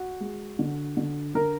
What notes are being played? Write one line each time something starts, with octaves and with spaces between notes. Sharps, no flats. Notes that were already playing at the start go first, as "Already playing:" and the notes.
Already playing: F#4
G#3
D3
D3
D3 A#4